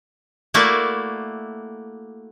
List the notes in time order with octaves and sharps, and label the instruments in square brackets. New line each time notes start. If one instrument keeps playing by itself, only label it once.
[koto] A3 A#3 E4 F#4 D5